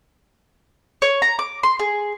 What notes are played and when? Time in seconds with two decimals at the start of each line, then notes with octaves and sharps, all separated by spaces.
1.02 C#5
1.22 A#5
1.39 D6
1.63 C6
1.79 G#4